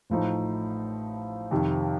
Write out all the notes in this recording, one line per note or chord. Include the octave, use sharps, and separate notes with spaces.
A1 A2 F3 A3 D#4
F2 C3 D#3